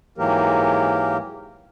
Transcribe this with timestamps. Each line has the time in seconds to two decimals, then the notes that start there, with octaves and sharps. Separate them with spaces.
0.18 G#2 E3 F#3 A#3 G4 A#4